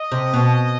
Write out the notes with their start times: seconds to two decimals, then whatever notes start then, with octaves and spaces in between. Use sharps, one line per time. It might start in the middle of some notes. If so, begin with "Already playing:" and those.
Already playing: D#5
0.11 C3
0.34 B2